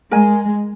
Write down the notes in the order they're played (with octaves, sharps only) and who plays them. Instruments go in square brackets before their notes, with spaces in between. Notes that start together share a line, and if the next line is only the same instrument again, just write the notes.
[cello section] G#3 [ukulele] A#4 D#5 G#5